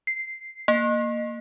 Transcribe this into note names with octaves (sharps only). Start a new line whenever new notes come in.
C7
A#3